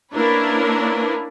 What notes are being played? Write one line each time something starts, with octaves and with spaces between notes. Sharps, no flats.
A#3 C#4 D4 E4 A#4 B4